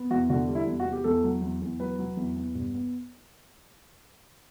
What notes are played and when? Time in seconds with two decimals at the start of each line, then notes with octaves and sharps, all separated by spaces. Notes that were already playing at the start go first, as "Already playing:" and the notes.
Already playing: B3
0.11 E2 F#4
0.30 D3 F#4
0.49 G3
0.55 E4
0.67 E2
0.80 F#4
0.86 B3
0.92 G4
1.04 E2 A4
1.23 F#3
1.42 E2
1.62 E2
1.80 F#3 B4
1.99 F#3
2.17 E2
2.36 B3
2.55 G2
2.74 B3